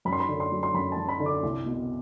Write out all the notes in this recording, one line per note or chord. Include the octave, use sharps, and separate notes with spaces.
F#2 B5
C6
B5
D3
C6
F#3
C6
F#2 B5
A5
F#2
B5
D3
D6
C2
B2